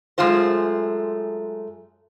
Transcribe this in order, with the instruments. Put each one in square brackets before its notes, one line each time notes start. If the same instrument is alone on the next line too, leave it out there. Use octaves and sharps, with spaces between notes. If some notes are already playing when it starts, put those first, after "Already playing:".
[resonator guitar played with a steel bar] F#2 G#3 A3 F4 C5